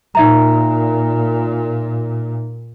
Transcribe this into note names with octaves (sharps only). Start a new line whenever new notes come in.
A#2 D#4 E5 A#5